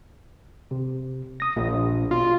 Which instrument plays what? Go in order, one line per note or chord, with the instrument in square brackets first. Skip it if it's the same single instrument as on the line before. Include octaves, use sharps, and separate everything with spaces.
[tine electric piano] C3
D#6 A#6
[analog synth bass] A#1 [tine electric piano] A#2
[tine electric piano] B2 [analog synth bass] F4